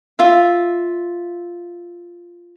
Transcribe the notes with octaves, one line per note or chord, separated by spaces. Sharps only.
F4 E5